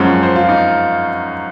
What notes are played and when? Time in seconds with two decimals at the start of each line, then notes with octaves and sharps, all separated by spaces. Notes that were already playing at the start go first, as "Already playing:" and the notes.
Already playing: F#2 F3 G#3 C#4
0.23 C5
0.36 F4
0.49 D#4